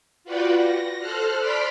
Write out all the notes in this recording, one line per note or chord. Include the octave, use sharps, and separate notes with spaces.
F4 F#4 B4 D5 F#5 G5
A#6
A4 C5 F6 F#6
D5 B5 C6 D6 F6 B6